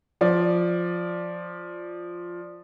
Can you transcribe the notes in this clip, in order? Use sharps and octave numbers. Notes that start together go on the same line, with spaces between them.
F3 D5